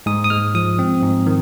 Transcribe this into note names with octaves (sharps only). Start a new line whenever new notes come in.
G#2 D#6
D#6
G#3 F6
F3 D#6
C4
G#2
D#3